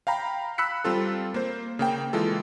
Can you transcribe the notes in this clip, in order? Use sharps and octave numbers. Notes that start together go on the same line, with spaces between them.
F5 G5 A#5 B5
B5 E6 F#6 B6 C#7
G3 C4 F4 A4
A#3 C5
C#3 A#3 G5
E3 G#3 F4 A4